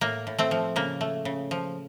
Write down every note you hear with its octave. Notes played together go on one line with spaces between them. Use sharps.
A2 A#3
A2
A3 C4
F3
C#3 A#3
A3
C#3
F3